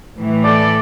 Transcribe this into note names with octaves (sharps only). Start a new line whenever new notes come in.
A2 E3
A4 D5